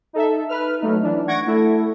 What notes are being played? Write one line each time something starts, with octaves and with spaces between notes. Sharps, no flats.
D#4 A4 E5
B4 F6
F#3 A3 D#4
E3 D4
F#5 C#6 G#6 A#6 D7
A3 E4 A4